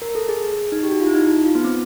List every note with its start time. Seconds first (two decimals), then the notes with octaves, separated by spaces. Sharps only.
0.02 A#4
0.15 A4
0.29 G#4
0.72 D#4
0.83 G4
0.91 F#4
1.00 F4
1.07 E4
1.15 D#4
1.45 F4
1.55 B3
1.64 C4